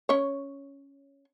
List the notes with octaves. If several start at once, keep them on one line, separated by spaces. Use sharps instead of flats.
C#4 C#5